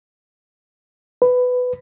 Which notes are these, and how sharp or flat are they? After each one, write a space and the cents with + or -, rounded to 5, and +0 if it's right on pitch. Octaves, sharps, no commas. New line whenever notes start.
B4 +15